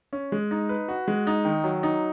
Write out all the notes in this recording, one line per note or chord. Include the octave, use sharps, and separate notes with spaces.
C#4
G#3
D#4
B4
F#4
G#3
D#4
D#3
F#3
D#4